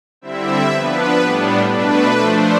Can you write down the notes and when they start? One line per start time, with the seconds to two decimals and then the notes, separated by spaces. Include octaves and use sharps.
0.21 D3 G3 C4 E4 E5
0.71 F3 B3 D4 B4
1.20 A2 G3 B3 D4
1.69 B2 A3 D4 B4
2.18 F3 A3 D4 C5